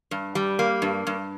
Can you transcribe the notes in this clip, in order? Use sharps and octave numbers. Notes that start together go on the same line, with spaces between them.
G2
G3
A#3
G2
G2